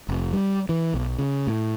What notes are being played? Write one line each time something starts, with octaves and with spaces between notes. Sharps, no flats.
F1
G3
E3
B1
C#3
A2